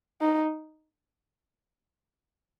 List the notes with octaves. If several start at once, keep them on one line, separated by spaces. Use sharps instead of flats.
D#4